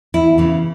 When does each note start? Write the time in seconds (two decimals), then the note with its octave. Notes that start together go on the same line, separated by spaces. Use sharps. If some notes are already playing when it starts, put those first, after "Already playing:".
0.14 E2 E4
0.38 C#3 E3